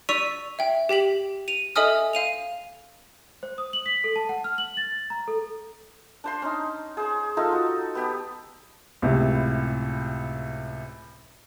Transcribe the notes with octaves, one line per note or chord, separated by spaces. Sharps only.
D5 C#6 E6 B6 D#7 F7
E5 G5
G4 G5 B6 F#7
D#7 F7
A4 D#5 E5 G#5 D#6 F6
F5 D#7 F7
C5
D#6
F#7
B6
A4
A5
F#5
F6
F#7
A6
A#5
A4
D4 C5 C6
C#4 D#4
G#4 C5
D#4 F4 A4 D#5
F#4
B3 G4
C#2 A2 C3